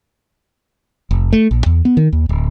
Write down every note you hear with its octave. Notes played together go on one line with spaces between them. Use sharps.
F1
A3
A#1
E2
B3
D#3
D#2
D1